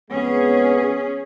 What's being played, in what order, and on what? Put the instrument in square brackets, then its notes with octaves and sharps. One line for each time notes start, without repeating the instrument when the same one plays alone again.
[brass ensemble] F2 G#3 B3 [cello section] C#4 G#4